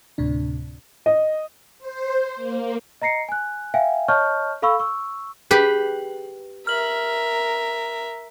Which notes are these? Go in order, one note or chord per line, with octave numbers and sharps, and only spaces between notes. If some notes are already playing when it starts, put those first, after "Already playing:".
D2 A2 C3 D4
D#5
C5
A#3
D#5 A#5 A#6 C7 C#7
G#5 F#6
E5 F5 G5 G#5
C#5 D#5 A5 C#6 F6 G6
A4 F5 B5 C#6 E6
C#6 E6
G4 G#4 B4
A#4 E5 F6 F#7